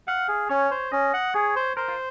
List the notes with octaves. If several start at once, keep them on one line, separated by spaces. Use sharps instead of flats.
F5 F#5
G#4
C#4 C#5
C5
C#4 D#5
F#5
G#4 C#5
C5
A#4 C5
F4